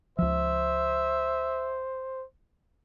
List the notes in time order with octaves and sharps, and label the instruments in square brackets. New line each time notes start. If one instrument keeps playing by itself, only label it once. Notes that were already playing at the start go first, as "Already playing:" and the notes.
[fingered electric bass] C#2 F3 [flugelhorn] C5 [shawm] E5